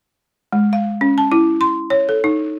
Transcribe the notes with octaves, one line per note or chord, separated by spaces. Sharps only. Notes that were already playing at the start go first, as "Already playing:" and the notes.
G#3
F5
C#4
A5
E4
C6
C#5
A4
D#4